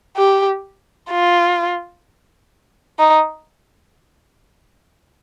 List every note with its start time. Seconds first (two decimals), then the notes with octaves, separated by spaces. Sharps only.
0.17 G4
1.11 F4
2.99 D#4